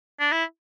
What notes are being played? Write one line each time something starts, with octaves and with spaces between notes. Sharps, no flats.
D4
E4